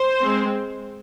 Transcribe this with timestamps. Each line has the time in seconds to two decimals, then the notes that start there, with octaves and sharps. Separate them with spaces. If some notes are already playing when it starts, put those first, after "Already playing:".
Already playing: C5
0.23 G#3 C4